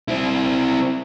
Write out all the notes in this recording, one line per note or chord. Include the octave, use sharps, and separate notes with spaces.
C4 E4